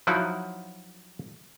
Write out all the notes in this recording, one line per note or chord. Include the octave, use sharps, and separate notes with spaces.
F3 F#3 D#4 E4 F#4